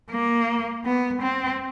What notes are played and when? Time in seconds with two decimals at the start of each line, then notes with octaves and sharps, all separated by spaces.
0.11 A#3
0.85 B3
1.22 C4